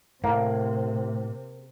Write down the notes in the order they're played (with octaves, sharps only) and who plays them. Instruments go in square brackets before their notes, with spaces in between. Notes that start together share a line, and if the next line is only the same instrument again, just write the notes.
[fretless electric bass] A2 [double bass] C3 [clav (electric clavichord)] A#3